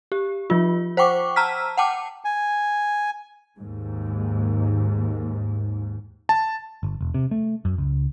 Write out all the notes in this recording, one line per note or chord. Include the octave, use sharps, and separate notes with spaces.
G4
F3 F4
C5 F#5 G5 C#6 D6
A5 A#5 E6 F6 B6
F#5 G5 A5 D6
G#5
D#2 G#2
A5
G1
E1
C3
A3
F#2
C#2